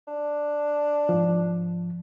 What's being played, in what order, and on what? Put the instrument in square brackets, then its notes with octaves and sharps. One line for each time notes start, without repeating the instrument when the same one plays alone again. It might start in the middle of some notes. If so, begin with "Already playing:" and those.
[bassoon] D4
[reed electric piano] G#2 F3